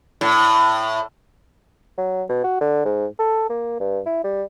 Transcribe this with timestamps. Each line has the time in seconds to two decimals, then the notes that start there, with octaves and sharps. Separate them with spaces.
0.21 A2
1.98 F#3
2.29 B2
2.44 F#4
2.61 D3
2.85 G#2
3.19 A4
3.49 A#3
3.80 G2
4.06 E4
4.24 G3